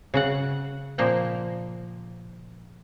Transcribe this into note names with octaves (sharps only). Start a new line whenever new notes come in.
C#3 F#4 F#5
A#2 F3 A#3 G5